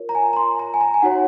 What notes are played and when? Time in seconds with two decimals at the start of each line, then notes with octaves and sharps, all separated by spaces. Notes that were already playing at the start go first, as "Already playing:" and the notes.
Already playing: F4 A#4 C#5
0.09 A#5
0.15 G#5
0.33 A#5
0.36 C6
0.59 A#5
0.74 G#5
0.81 A#5
0.94 G#5
1.02 D#4 F#4 C#5 F#5